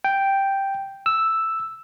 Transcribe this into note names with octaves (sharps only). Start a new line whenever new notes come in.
G5
E6